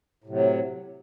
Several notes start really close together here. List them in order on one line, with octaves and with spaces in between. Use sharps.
A2 C3 F#3